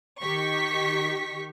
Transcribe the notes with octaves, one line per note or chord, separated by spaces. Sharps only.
D#3 G4 C#6 B6